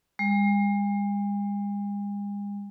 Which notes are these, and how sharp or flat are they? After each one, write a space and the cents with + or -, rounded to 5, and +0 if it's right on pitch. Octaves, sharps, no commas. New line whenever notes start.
G#3 -45